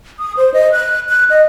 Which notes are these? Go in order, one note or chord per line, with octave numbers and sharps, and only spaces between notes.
D#6
C5
D#5
F#6
F#6
D#5